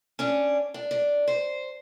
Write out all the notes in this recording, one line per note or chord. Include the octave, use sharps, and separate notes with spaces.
C#4 D4
D4
D4
C5